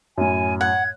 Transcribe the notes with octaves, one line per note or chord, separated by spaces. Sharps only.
F#2 A2 G#5
F#5 G#6